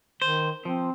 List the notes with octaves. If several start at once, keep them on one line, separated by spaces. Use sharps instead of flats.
D#3 C5
F3 C4